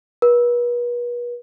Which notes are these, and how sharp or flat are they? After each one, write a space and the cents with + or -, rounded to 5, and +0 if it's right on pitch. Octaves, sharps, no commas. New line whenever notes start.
B4 -40